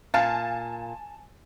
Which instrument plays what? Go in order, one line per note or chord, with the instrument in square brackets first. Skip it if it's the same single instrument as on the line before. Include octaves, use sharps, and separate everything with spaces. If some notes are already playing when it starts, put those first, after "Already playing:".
[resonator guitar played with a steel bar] A#2 F5 [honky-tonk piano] G#5 A5 A6